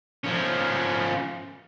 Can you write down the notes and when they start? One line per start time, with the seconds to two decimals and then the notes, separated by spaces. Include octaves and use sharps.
0.24 F3 C#4